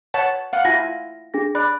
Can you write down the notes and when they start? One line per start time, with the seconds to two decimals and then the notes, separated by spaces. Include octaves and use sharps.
0.14 C#5 F#5 A5
0.53 F5 F#5
0.65 E4 F4 G#5 A#6
1.34 D4 G#4 A#6
1.55 D5 B5 F#6